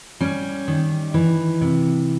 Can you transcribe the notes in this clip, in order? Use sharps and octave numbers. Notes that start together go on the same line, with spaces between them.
G3 C#4
D#3
E3
C3